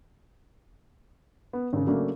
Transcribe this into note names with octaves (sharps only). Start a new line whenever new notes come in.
B3
G#1 C#3
C#3 F#3 A3 A#3 D4